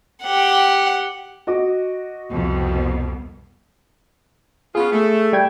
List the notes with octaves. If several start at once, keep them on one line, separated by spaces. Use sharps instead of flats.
G4 F#5
F#4 D#5 D6
C2 F2 B2
B3 C#4 F4 G#4
A3
G3 G5 G#6